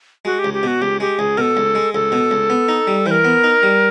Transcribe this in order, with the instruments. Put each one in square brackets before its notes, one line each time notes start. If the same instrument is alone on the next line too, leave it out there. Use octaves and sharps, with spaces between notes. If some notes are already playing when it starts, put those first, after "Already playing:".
[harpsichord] G#3 [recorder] F#4
[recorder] G4
[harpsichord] C#2
[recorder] G4
[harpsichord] B2 [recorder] F#4
[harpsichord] C#2 [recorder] G4
[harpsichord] G#3 [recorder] G4
[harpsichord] C#2 [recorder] G#4
[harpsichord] B2 [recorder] A4 A#4
[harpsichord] C#2
G#3
[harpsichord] C#2 [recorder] A4
[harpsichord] B2
C#2
B3
D#4
G3
[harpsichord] E3 [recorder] C5
[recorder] A#4
[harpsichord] B3
D#4
G3